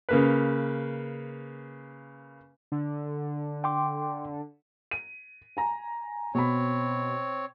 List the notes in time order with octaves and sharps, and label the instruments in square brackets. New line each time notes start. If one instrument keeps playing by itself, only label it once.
[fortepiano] C#3 A#3 B4
[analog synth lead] D3
[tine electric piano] G5 C6 D6
[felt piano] D#7
G#5 A#5
[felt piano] B2 B5 [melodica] C4 C#5